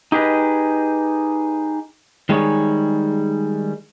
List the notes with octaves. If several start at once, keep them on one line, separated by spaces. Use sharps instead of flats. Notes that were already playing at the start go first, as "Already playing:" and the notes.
D#4 G4 G#4 B4 D#5
D#3 G3 G#3 D#4 G#4 C#5